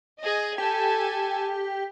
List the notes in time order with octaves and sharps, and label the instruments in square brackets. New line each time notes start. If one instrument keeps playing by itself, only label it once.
[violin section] G#4 D#5
[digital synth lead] G4 [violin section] A4 G#5